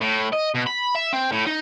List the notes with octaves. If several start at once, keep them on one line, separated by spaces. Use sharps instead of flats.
A2
D#5
B2
B5
E5
C4
A2
D#4